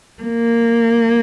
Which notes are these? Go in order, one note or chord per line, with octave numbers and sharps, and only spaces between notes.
A#3